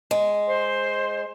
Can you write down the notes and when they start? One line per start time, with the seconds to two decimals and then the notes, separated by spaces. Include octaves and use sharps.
0.11 G#3
0.46 C5 C6